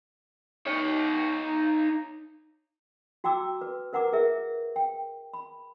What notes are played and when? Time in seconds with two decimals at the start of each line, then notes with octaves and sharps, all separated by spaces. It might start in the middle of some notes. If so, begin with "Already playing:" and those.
0.66 D#4 C#5
3.24 F#4 G5 A#5 D6 E6
3.61 B4
3.93 A#4 B4 F#5 A#5 D6
4.12 G#4 A#4 E5
4.76 G5
5.34 B5